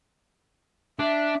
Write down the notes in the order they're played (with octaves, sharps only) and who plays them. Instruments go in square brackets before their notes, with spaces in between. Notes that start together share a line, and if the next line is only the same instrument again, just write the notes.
[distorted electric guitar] D4 [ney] E5